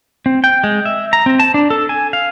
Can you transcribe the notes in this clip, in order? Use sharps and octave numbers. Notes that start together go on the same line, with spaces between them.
C4
G5
G#3
E5
A#5
C4
A5
D4
A4
G#5
F5